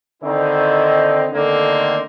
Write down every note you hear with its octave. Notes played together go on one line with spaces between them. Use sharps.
D3 D#3 C4 D#4 E4
D3 D#3 A3 A#3 C4